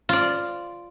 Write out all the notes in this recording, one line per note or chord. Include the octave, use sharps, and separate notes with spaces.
F4 D5